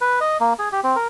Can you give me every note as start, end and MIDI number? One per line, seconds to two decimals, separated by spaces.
0.01 0.19 71
0.21 0.37 75
0.40 0.53 58
0.59 0.69 68
0.72 0.80 67
0.84 0.96 60
0.96 1.08 70